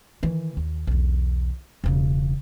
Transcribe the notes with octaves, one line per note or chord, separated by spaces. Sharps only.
D#3 E3
D#2
B1 E2
E1 C#3